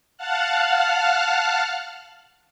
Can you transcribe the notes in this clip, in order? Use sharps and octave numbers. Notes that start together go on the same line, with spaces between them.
F5 F#5 A5 F6 F#6